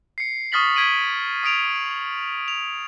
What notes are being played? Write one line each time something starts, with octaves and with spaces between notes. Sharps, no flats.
C7 C#7
C#6 D#6 F6 A6 B6 F#7
G#6 B6 D7 D#7 F#7
D#6 B6 D7 F7
F7